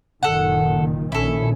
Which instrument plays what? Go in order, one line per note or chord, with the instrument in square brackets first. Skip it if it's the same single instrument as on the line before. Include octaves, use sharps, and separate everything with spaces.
[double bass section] F#1 A#2 D#3 [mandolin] A4 F#5
[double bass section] A#1 D#3 C#4 [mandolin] E4 A4